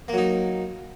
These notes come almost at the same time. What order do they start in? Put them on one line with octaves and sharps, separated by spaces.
A#3 F#3 D#4